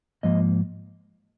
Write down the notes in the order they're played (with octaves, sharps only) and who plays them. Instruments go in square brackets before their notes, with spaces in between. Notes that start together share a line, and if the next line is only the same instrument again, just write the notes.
[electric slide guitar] G#2 F3 A#3 D#5